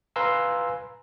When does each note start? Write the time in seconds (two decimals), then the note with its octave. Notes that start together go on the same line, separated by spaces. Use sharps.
0.16 B4 F5 G#5 A#5 C6 E6